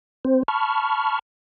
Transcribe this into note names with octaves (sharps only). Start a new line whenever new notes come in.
C4 C5
A5 B5 C#6 F6